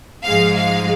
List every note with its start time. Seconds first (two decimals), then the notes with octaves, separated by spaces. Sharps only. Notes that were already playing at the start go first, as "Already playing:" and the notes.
0.24 G#2 F3 G#3 F5
0.56 F5